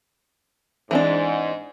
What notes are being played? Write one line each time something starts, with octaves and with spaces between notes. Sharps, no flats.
G#2 E3 C4 D4